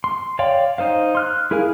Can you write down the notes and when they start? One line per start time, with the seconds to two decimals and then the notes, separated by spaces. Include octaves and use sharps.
0.04 C6
0.39 C#5 D5 F5 G5 C6
0.78 D#4 C5 F5
1.15 C6 F6 F#6
1.51 E4 G#4 A#4 F5 G#5